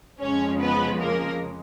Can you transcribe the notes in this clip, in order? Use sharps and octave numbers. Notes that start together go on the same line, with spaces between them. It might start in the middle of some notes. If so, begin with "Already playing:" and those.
F2 C#3 F3 G#3 C#4 C#5
B3 B4
A#3 A#4